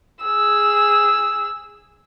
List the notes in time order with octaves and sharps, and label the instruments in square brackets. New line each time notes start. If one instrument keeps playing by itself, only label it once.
[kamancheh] G#4 E6